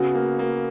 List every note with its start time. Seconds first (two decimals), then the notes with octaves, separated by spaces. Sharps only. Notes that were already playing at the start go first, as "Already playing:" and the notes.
Already playing: C#3 B3 F#4
0.15 A#3
0.39 A#3